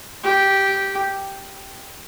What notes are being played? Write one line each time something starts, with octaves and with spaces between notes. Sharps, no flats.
G4